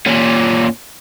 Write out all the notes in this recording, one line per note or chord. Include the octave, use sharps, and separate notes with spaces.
A#2 C#4